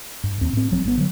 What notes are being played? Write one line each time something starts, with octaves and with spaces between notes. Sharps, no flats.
G2
D#2 C4
A2 C4
D#1 F3 F#3 C4
G#1 G2 B3
D3 E3 F#3